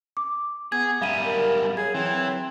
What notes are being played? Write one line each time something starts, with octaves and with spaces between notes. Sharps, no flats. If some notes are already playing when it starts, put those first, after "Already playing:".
D6
B3 G#4 G#6
F#2 G3 E5 F5 D#7
A#4
F#3 G#4 G#6
E3 F#3 C4